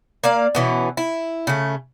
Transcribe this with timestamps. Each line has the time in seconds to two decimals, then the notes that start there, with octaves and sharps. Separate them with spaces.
0.24 A#3 D5 F5
0.55 B2 E3 C#4
0.97 E4
1.47 C#3 A3